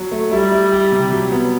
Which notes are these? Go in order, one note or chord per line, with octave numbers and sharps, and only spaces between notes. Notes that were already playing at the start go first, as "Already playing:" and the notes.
Already playing: F#3
A3
G3 E4
E4
G4
C3
F#3
B3